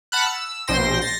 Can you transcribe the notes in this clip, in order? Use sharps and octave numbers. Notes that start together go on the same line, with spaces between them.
F#5 A5 B5 F6 F#6
E6
A#1 B2 C5 G5 C6 A#6
A6 A#6 C7